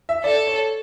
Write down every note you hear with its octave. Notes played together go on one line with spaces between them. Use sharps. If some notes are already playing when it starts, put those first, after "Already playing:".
E5
A4 D5
C#5